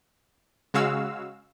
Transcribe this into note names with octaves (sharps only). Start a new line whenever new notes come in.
C#3 G#3 F#4 F5 E6